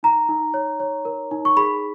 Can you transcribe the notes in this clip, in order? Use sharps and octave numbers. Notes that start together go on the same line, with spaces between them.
D#4 A#5
D#4
C#5
C#5
A#4
D#4
C#6
G#4 B5